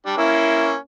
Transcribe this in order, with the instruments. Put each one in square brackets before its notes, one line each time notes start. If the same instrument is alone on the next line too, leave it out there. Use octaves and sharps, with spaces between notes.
[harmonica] G3 [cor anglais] D4
[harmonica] A#3 C#4 [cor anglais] E4